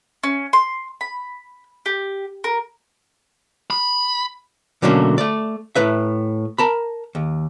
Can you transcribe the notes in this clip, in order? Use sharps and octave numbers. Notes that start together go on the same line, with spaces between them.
C#4
C6
B5
G4
A#4
B5
B2 D3 F#3 A3 A#3 C#4
A3 D5
A2 B4 E5
A#4 A5 B5
D#2